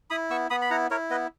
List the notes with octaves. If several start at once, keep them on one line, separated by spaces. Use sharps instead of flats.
E4 B5 D#6
B3 C#6 E6
B3 B5 D#6
B5
E4 F#5 A#5
E4 A#4 C#5
B3 B4 D#5